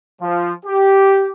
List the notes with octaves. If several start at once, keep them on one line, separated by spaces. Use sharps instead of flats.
F3
G4